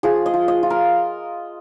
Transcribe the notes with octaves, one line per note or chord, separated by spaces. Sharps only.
F3 G#4
D#5
F3
D#5
F4
A#4